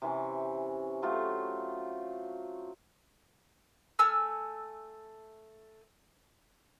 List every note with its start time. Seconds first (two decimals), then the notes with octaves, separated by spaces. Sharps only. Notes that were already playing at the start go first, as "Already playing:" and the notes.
0.02 C3 E3 C#4
1.02 F#3 A3 F4 G4
3.99 A3 G#5 E6 F6